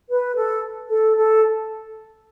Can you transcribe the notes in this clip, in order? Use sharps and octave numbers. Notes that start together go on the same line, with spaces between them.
B4
A4
A4
A4